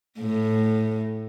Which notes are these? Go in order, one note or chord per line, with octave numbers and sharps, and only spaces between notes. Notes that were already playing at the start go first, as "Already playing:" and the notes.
A2